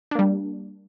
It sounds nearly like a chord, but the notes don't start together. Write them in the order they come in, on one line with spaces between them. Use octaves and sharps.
D4 A#3 G3